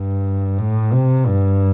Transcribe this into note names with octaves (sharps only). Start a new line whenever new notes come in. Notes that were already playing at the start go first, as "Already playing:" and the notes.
Already playing: G2
A2
C3
G2